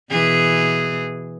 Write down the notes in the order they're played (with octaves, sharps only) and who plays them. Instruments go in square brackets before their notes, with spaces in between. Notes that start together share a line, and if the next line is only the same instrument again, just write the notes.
[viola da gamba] B2 E3 G#4